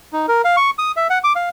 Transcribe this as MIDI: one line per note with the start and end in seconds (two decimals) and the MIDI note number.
0.13 0.26 63
0.28 0.42 70
0.44 0.56 77
0.57 0.70 85
0.79 0.92 87
0.97 1.07 76
1.10 1.19 78
1.24 1.33 86
1.36 1.49 77